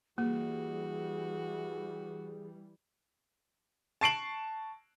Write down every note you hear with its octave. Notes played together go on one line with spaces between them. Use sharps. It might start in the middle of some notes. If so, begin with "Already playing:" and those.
E3 G3 A#3 F#4 G#4
A5 C#6 C7 D7 E7 F#7